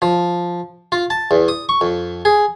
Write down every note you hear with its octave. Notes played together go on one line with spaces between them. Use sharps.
F3
F4
A5
E2
D#6
C#6
F2
G#4